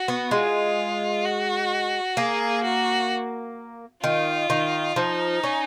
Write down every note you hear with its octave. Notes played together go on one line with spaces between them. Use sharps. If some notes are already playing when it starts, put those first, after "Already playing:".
Already playing: F#4
B3
G#3 F4
F#4
A#3 G#4
F#4
D#3 F4
D#3
F3 D#4
C#4